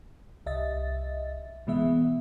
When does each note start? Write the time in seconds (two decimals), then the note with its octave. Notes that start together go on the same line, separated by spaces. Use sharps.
0.46 C2 D#5 E5 A6
1.67 B2 E3 G#3 B3 E5